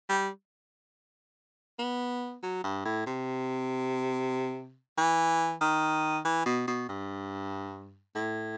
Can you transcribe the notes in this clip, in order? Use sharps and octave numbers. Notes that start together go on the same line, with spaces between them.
G3
B3
F#3
G2
A2
C3
E3
D#3
E3
B2
B2
G2
A2